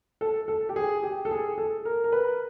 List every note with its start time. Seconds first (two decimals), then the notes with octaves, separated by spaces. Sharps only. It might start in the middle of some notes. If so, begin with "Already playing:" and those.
0.21 A4
0.48 A4
0.69 G4
0.76 G#4
1.03 G4
1.25 A4
1.31 G#4
1.58 A4
1.85 A#4
2.04 A#4
2.12 B4